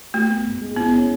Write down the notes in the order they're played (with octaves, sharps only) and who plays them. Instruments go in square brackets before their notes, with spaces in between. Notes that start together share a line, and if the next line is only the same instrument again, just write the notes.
[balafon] A3 [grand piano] F#4
[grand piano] B3
G#2
G#3
[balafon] B3 [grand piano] E4
[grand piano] C#4